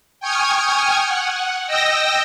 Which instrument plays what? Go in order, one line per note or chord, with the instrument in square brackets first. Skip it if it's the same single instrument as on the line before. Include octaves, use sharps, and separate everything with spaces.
[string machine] G5 G#5 C#6 D#6 F6 G#6
F#5
D#5 G5 E6 A#6